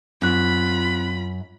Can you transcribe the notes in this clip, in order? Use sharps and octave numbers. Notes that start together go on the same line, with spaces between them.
F#2 C4 F4 B5 F#6 B6